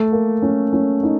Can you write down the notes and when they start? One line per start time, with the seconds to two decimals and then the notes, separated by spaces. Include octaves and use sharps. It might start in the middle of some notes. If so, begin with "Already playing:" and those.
Already playing: A3
0.12 A#3
0.42 C#4
0.73 C#4
1.03 D#4